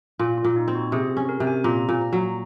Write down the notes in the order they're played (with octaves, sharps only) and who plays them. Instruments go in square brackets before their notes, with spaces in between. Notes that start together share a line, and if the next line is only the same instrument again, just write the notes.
[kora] A#2 [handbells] F4
[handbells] F4
[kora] A#2
[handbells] D#4
[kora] C4
[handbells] F#4
[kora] C3 [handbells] G#4
[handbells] G#4
[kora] C#4
[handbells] A#4
[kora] C3
[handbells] G#5
[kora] A#2 [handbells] A#5
[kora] A#2
[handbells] A#5
[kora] F#3